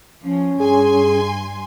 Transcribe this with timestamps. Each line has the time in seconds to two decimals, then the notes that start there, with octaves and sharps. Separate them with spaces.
0.24 F3 C#4
0.61 G2 G#4 G#5 C6